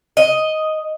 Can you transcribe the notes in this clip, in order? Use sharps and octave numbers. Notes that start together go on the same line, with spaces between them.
D#5